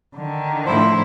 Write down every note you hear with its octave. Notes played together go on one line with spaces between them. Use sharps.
D3 D#3
A2 F3 E4 C5